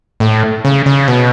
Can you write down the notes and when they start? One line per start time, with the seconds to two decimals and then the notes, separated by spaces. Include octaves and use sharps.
0.20 A2
0.65 C#3
0.86 C#3
1.08 B2